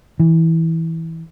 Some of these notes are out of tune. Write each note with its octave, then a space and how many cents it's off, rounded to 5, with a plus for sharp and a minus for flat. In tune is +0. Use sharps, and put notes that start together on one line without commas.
E3 -15